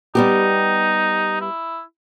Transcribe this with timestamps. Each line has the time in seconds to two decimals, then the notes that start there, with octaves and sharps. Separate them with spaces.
0.15 G3 B3 D#4 G4
1.41 E4